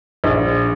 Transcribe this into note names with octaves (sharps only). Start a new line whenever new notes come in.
A#1